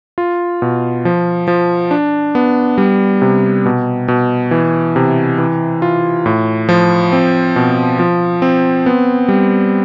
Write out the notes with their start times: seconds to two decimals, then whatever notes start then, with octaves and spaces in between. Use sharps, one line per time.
0.18 F4
0.62 B2
1.05 F3
1.48 F3
1.91 D4
2.35 B3
2.78 G3
3.22 C3
3.66 B2
4.08 B2
4.51 E3
4.96 C3
5.38 E3
5.82 F4
6.26 A2
6.69 F3
7.12 C4
7.56 B2
7.99 F3
8.42 C4
8.86 B3
9.28 G3